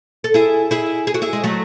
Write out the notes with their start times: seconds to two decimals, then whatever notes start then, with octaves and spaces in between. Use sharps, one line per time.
0.24 A4
0.34 E4 G#4
0.71 E4 G#4
1.07 G#4
1.14 F#4
1.22 E4 G#4
1.33 G#3
1.44 F#3 A3